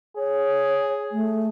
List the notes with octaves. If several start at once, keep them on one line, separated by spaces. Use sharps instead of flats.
G#4 C#5
A3